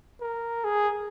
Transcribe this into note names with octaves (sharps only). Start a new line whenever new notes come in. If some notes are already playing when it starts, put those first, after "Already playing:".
A#4
G#4